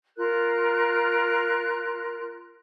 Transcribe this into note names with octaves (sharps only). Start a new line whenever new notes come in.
F4 A#4 F#6